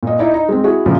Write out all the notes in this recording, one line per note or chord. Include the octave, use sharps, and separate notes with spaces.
A#2 D#5
D#4 E4 D5
D#4
G#3 C4
E4 F#4 G#4
F#2 A#2 C#3 F3